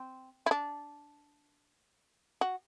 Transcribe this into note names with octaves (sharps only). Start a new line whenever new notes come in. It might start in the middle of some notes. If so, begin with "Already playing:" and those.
Already playing: C4
E4
D4
F#4